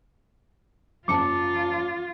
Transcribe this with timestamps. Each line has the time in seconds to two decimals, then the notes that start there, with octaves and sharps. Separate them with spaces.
1.08 F#1 F4 A5 D6 C#7